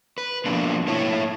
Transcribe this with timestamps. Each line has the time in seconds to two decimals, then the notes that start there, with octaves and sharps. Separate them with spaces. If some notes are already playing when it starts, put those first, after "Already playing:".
0.18 B4
0.45 B2 D3 F3 A#3 C4 D4
0.87 A3 A#3 E4 C#5 E5 A5